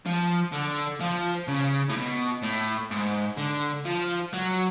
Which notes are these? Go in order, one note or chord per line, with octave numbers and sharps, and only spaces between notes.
F3
D3
F3
C#3
A2
B2
A2
G#2
D3
F3
F#3